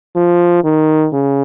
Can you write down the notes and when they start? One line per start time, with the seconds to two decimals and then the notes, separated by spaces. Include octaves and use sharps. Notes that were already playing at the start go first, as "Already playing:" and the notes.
0.16 F3
0.64 D#3
1.13 C#3